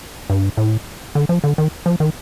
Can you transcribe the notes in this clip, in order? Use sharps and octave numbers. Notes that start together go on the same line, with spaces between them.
G2
A2
D3
F3
D3
D#3
F3
D#3